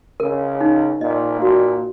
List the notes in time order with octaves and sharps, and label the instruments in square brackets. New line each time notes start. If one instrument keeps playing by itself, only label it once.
[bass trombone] C#3 [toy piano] A#4
[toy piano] D#4
[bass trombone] A#2 [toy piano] D#5
[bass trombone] A#2 [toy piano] F#4